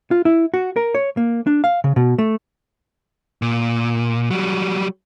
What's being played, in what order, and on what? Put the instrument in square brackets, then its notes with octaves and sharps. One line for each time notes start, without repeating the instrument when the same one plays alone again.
[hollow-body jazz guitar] F4
E4
F#4
A#4
C#5
A#3
D4
F5
C#3
B2
A3
[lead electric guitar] A#2
F#3 G3